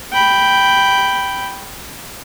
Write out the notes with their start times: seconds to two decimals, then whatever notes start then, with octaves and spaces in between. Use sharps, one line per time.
0.12 G5 B5